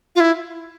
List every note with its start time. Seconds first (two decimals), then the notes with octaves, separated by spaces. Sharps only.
0.16 F4
0.20 E4